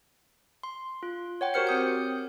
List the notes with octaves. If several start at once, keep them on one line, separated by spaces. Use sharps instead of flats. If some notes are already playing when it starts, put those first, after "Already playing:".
C6
F4
C#5 F#5 G5
F#4 G4 A#4 C5 F6 C#7
C4 D#6 G6